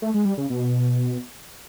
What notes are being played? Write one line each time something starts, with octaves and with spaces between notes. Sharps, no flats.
A3
G#3
G3
C#3
B2